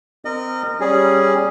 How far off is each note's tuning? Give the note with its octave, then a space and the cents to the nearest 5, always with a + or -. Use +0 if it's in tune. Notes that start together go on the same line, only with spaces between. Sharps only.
C4 -30 A#4 -20 D#5 -30
G3 +0 C#4 -5 G#4 +0